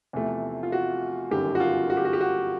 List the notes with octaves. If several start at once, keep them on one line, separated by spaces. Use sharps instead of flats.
E2 C3 F3 A3
F4
F#4
G1 F#2 D#3 G4
F#4
F4
F#4
G4
F#4
G4
F#4